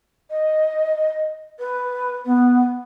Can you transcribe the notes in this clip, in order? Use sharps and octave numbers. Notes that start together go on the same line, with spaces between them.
D#5
B4
B3